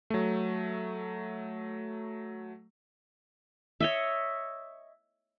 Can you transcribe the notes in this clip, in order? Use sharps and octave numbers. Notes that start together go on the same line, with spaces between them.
F#3 A3
C#5 D#5 E5